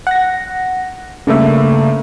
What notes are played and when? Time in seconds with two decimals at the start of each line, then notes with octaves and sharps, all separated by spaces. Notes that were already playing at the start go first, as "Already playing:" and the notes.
0.07 F#5 A#6
1.27 G2 C#3 A3 A#3 E5